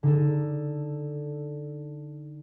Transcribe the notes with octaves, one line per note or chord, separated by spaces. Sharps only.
D3 D#4 A4